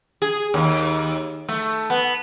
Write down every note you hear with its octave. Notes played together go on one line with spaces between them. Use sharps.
G#4
D#2
A3
B3